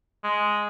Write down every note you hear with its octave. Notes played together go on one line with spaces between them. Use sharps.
G#3